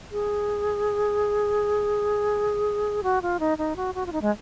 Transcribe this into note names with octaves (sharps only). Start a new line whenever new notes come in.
G#4
F#4
F4
D#4
D#4
F#4
F#4
F4
D#4
G#3